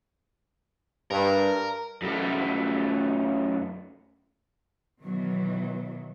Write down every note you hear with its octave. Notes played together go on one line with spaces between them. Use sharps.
G2 A#4
F#2 A3
B2 D#3 E3 F#3